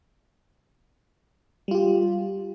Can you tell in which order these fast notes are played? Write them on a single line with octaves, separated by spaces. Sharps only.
G3 F4 G4